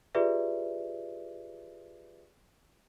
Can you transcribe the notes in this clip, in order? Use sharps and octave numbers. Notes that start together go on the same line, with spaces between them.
F4 G4 G#4 B4 D5 E5